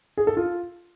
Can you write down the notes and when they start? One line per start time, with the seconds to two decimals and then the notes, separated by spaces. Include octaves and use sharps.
0.18 G#4
0.27 A4
0.37 F4